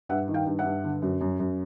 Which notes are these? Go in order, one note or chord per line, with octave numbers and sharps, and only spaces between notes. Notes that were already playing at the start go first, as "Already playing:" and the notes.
G2 E5 F#5
D#3
F5 G5
G2
E5 F#5
G2
D3
F#2
F#2
F#2